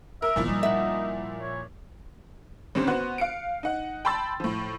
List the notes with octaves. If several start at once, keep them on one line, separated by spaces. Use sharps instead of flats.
A#4 E5
A#2 D#3 F3 B3 E4
G3 D#4
E5 F#5
C#5
A1 D3 C4 C#4 G4 C5
B3 F#4 C5 F#6
F5 C#7 D7
D#4 F#5
G5 A5 B5 C6 E6 A6
A2 F3